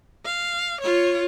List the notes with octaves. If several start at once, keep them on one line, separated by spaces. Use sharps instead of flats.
F5
F4 C#5